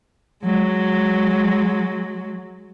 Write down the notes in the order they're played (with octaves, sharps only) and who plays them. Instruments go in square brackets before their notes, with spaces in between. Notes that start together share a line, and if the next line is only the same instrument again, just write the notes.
[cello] F#3 G#3